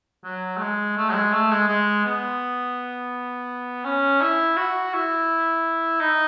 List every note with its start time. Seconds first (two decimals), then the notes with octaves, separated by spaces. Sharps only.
0.24 F#3
0.57 A3
0.60 G#3
0.97 A3
1.09 F#3
1.14 G#3
1.33 A3
1.51 G#3
1.68 G#3
2.05 B3
3.84 C#4
4.21 E4
4.57 F#4
4.93 E4
6.01 D#4